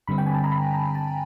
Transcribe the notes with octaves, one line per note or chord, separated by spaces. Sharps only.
G2 D3 G3 C4 B5
G5
G#5
A5
A#5
B5
A#5
A5